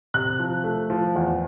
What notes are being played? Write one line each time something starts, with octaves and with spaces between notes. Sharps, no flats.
C3 F#6
F3
A3
F3
E2